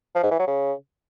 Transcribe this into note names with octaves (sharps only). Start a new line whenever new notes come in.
F3
G#2
E3
F#3
C#3